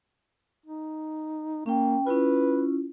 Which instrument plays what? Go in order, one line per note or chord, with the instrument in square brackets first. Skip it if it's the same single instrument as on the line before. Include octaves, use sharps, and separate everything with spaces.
[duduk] D#4
[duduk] A#3 [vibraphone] C#4 G5
[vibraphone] C#4 E4 F4 [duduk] B4